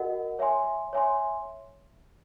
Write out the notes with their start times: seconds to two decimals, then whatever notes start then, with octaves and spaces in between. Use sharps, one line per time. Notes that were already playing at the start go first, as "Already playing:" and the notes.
Already playing: F#4 A#4 D#5 F#5
0.39 C#5 E5 G#5 C6
0.93 C#5 E5 G#5 C6